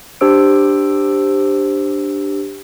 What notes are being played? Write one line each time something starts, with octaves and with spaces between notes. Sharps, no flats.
D4 G4 C5 E6 D7